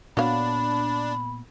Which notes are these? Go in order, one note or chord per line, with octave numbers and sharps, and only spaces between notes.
A#2 B3 D4 F#4 C#5 F5 B5